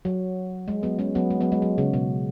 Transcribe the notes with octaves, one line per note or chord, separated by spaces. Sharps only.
F#3
G#3
F#3 B3
G#3 C#4
F#3 B3
G#3
F#3 B3
G#3
F#3
C#3
B2